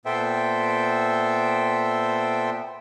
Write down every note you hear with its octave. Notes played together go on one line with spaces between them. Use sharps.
A#2 B3 A4 C5 E5 G5